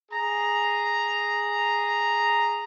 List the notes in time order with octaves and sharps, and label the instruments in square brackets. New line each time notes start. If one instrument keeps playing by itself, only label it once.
[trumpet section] G#4 A#5